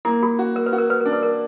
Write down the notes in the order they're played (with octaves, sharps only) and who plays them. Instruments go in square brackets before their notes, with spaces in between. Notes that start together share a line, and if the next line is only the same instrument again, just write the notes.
[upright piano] A#3 [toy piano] E4
[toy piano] F#4
[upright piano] F#4
[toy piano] A#4
B4
[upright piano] F#4
[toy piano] A#4
B4
A#4
[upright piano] D4
[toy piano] B4
A#4